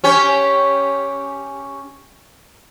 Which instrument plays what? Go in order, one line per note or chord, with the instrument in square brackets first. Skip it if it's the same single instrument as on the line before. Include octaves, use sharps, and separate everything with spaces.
[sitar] C#4 G4 C#5